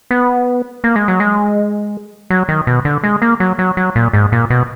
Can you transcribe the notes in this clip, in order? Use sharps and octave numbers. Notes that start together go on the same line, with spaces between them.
B3
A#3
G#3
F#3
G#3
F#3
D#3
B2
D3
G#3
A#3
F#3
F#3
F#3
A#2
G#2
A#2
B2